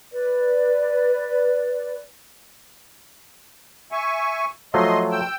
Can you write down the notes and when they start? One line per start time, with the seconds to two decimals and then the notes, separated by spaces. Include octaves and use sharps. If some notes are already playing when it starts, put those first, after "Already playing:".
0.12 B4 D5
3.92 E5 G#5 C#6
4.74 F3 F#3 A3 D#5 C6
5.11 G5 E6